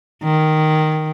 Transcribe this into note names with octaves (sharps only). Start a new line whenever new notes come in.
D#3